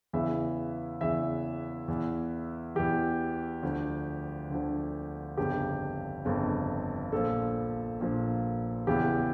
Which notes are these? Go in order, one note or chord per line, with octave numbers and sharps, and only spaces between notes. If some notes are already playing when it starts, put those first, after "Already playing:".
E2 C#3 E3 E5
E2 C#3 E3 E5
E2 E3
E2 E3 G4
D2 D3 F3
D2 D3 F3
G1 F2 C#3 G4
G1 F2 C#3
A#1 A#2 F3 A4
A#1 A#2 F3
E2 C#3 E3 G4